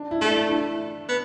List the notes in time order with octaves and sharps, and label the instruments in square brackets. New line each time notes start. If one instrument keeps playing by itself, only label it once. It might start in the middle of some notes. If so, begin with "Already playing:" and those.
Already playing: [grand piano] D4
E4
[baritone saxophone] A3
[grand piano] D4
E4
[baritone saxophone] B3